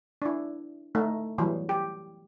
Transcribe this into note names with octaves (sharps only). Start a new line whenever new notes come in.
D4 E4
A3 D#4
E3 F#3 G3
G4